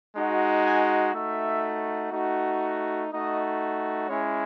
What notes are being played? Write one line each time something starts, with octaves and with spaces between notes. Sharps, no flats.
G#3 D#4 F#4
G#5
A3 D#4 F#4 E5
A3 D#4 F#4
A3 D#4 F#4 D#5
G#3 C#4 E4 C#5